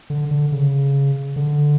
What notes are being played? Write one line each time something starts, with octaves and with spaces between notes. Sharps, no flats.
D3
D3
C#3
D3